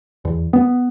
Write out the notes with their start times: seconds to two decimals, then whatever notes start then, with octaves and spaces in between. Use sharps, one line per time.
0.25 E2
0.53 B3